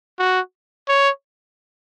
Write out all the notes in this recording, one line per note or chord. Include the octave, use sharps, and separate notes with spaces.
F#4
C#5